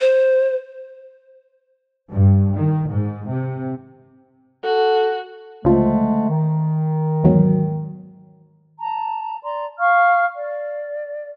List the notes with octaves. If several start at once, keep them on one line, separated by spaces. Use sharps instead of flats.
C5
G2
D#3
G#2
C3
F#4 A4
C#2 D3 F3 G#3 A3
D#3
E2 G#2 F#3
A5 A#5
D5 A#5 C6
F5 C#6 F6
D5